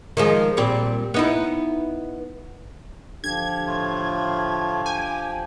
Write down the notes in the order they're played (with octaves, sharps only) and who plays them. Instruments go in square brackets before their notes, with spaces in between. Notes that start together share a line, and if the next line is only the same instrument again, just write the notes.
[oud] D#3 F3 G#3
A#2 G3 C4
B3 D#4 E4
[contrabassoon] D3 [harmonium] F3 G4 [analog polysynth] G#6
[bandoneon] A2 A3 F4
[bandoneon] G5 D6 [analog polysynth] G#5